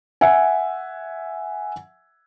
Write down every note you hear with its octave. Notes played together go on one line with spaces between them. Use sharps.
E5 F#5 G#5